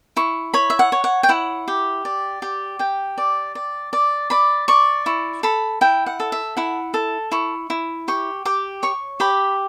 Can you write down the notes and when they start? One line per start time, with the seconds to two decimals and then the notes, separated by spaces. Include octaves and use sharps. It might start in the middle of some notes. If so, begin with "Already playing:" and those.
0.16 E4 C#6
0.54 C#5 B5
0.70 E5
0.79 F#5
0.92 C#5
1.04 F#5
1.23 G5
1.29 E4 F#5
1.68 G4
2.05 D5
2.42 G4
2.79 G4 G5
3.18 D5
3.55 D5
3.93 D5
4.30 D5 B5
4.68 D5 C#6
5.06 E4 C#6
5.43 A4 B5
5.81 E4 G5
6.06 F#5
6.20 A4
6.32 E5
6.57 E4 F#5
6.94 A4 A5
7.32 E4 C#6
7.70 E4
8.08 G4 C#6
8.45 G4 D6
8.83 C#5 C#6
9.20 G4 B5